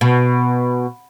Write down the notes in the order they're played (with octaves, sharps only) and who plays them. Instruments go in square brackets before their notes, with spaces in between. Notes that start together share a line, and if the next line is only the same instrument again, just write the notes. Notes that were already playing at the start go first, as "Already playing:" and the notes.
[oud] B2